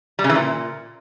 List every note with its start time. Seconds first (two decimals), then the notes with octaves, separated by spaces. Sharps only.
0.19 G3
0.24 C#3
0.30 E3
0.35 A#2